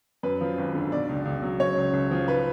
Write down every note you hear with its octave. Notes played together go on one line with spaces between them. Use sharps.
F#2 B4
F3
G#1
D3
B2 D5
C#2
C#2
F#3
C#3 C#5
C#2
C#2
F3
G#2 B4